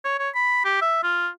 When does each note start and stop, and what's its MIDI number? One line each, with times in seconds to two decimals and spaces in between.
0.04 0.17 73
0.19 0.29 73
0.35 0.64 83
0.65 0.77 67
0.81 1.01 76
1.03 1.28 65